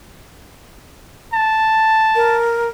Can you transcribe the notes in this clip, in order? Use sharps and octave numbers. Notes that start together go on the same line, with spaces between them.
A5
A#4